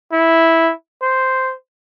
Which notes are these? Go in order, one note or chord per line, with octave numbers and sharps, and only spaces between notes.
E4
C5